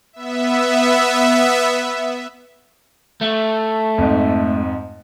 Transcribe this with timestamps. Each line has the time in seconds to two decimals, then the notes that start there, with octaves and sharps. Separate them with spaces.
0.13 B3 E5
3.21 A3
3.98 F2 G#2